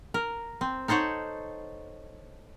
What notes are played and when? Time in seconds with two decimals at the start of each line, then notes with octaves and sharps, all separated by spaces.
0.14 A#4
0.61 C4
0.88 D#4 A4 C5 C#5 F#5